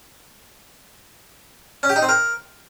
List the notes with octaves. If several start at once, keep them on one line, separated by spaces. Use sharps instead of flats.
C#4
G4
D#4
C4
A#4